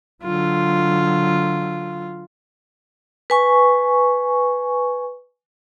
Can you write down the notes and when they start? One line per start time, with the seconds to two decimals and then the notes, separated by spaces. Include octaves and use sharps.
0.23 D3 F#3 F4
3.30 B4 G#5 C#6